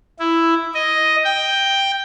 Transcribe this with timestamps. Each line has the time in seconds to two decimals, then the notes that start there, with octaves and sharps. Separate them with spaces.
0.20 E4
0.74 D#5
1.24 G5